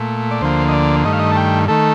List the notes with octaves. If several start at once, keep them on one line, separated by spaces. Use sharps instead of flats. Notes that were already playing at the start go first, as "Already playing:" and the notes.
Already playing: A#2 A3
D5
D2 D3 F3 A#3 C5
D#5
D5
G2 D#3 A3 D#5
F5
D#5
A5
G5
D#3 A3 A4